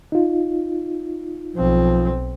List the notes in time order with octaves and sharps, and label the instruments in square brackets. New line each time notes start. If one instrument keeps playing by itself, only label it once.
[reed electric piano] D#4 F4
[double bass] B1 C4 [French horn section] F3